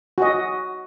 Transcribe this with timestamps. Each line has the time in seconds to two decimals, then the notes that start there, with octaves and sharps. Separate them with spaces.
0.18 F#4 D#5